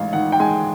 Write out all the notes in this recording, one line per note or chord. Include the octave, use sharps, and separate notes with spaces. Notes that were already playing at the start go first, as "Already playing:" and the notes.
Already playing: A1 G#2 F5
D#3 F#5
G5
G#3 G#5